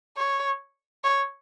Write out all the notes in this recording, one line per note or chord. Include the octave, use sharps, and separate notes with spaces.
C#5
C#5